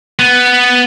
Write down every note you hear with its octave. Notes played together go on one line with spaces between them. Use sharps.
B3